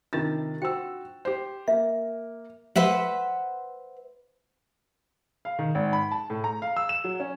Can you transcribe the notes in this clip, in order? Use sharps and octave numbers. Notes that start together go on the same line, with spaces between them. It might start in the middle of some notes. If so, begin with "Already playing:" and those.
C3 D#3 D4 D#4 F4 A6
F#4 C5 G5 E6
G4 C5
A#3 E5
B4 C5 E5 F#5
F5
D#3
G#1
B5
A5
A2
A#5
F5
E6
E7
F#3
C#4